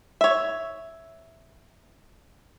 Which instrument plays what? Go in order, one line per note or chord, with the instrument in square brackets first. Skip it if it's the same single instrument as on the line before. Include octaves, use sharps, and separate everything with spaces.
[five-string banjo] C#5 E5